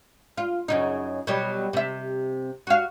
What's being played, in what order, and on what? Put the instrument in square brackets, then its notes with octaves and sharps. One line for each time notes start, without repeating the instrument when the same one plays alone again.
[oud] F4
F#2 C#3 D#4
B2 F#3 G3
C3 E5
F#4 F5